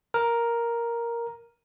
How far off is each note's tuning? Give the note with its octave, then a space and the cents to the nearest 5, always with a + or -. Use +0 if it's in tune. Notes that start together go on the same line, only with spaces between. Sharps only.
A#4 +5